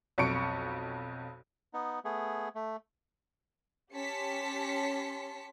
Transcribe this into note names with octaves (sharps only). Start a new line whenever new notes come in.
B1 F2 C#6 C#7 D7
B3 D#4
A3 B3 G#4
A3
C#4 G4 A5 C6 B6 C#7